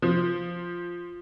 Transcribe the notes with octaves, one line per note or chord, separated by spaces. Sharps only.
F3